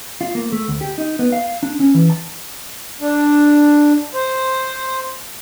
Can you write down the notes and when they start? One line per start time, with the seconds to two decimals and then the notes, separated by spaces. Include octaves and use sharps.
0.21 F4
0.35 A#3
0.52 A3
0.68 D2
0.81 G4
0.98 D#4
1.19 B3
1.32 F5
1.63 D4
1.80 C#4
1.94 E3
2.10 A5
3.01 D4
4.14 C5